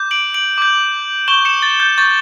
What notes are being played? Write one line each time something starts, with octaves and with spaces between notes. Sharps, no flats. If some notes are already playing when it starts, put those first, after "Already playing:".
Already playing: D6 G6
D7 F#7
D7 F#7
D6 G6
C#6 G6 E7 G7
C#7 E7
A6
G6
C#6 G6 A6